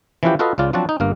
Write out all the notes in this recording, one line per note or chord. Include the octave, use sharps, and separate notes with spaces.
E3 F3 C#4 E4 F#4 G4
F4 F#4 A4 B4 D#5 F5
C#2 C#3 F4 D5
F3 F#3 C4 D4 F#4 A5
D#4
G1 G2 A#3 A#4